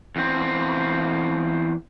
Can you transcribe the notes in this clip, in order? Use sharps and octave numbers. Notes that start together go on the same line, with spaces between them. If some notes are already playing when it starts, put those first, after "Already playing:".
E2 C4